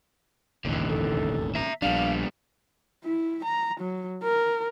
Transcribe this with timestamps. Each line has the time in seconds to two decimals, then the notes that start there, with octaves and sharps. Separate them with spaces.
0.65 E1 A1 D#2 D3 E3
0.88 A4
1.55 E5 A#5
1.82 A#1 G3 B3 D4 F5
3.04 E4
3.44 A#5
3.80 F#3
4.23 A#4